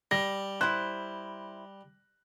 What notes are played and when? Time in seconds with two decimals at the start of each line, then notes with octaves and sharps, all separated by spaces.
0.11 G3 A#6
0.61 E4 C5 F#6